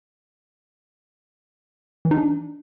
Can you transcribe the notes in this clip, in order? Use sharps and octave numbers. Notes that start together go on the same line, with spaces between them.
E3
D#4
D4